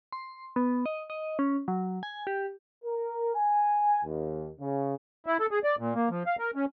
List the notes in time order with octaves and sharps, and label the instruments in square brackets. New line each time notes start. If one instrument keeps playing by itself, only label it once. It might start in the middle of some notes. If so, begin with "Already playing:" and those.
[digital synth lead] C6
B3
D#5
D#5
C#4
F#3
G#5
G4
[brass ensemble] A#4
G#5
D#2
C#3
[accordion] E4
A4
G#4
D5
A#2
A#3
F3
F5
A#4
C#4